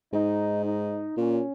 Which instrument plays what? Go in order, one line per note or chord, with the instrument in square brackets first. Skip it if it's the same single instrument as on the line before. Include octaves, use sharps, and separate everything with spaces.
[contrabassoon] G#2 [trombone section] D#4
[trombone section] D#4
[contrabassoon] A#2 [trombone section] C#4